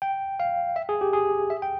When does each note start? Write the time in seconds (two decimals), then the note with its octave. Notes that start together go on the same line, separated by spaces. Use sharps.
0.02 G5
0.40 F5
0.76 E5
0.89 G#4
1.01 G4
1.13 G#4
1.50 E5
1.62 G5